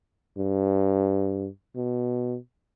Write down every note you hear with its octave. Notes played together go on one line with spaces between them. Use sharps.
G2
B2